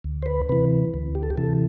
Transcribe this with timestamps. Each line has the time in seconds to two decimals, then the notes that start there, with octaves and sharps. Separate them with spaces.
0.04 D2
0.23 C5
0.26 B4
0.49 C3 E3 B4
0.94 D2
1.15 G4
1.23 A4
1.30 G4
1.37 C3 E3 A4